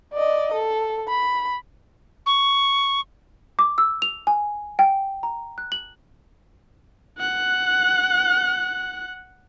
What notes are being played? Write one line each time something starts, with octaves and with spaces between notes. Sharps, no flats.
D5 D#5
A4
B5
C#6
D6
E6
F7
G#5
G5
A#5
F#6
F#7
F#5 F#6